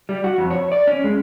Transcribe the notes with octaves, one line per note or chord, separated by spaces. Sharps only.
G3
F#4
F2
C#5
D5
C#4
G#3